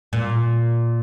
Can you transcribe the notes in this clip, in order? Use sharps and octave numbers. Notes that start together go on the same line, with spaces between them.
A#2